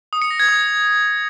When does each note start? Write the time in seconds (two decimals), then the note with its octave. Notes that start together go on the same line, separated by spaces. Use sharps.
0.13 D#6
0.22 C#7
0.31 A#6
0.40 G#6
0.49 D#6